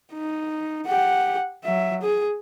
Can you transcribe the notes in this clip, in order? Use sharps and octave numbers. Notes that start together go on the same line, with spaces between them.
D#4
G4 F#5
F#3 E5
G#4